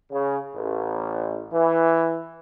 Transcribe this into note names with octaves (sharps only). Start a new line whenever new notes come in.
C#3
A1
E3